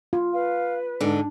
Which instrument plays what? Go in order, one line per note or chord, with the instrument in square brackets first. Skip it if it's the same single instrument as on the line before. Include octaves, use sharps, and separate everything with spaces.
[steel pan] F4
[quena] B4 [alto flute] F5
[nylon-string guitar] G#2 D3 [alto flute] D4